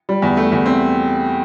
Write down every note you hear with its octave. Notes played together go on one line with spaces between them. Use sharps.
G3
E2
A3
E2
C4